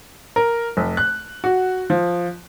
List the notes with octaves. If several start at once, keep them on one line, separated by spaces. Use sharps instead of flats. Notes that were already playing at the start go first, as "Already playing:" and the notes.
A#4
F1
F#6
F#4
F3